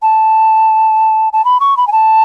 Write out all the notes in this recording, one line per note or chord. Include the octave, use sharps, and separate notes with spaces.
A5
A5
B5
C#6
B5
G#5
A5